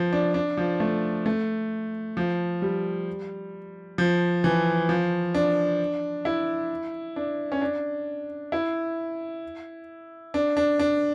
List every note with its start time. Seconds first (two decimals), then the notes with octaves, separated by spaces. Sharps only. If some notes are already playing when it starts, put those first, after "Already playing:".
Already playing: F3
0.13 D4
0.34 D4
0.57 F3
0.80 A3
1.26 A3
2.17 F3
2.62 G3
3.98 F3
4.44 E3
4.89 F3
5.35 D4
6.25 E4
7.16 D4
7.52 C#4
7.61 D4
8.52 E4
10.34 D4
10.57 D4
10.79 D4